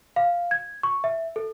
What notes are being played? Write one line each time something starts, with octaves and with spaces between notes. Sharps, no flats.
F5
G#6
C#6
E5
A4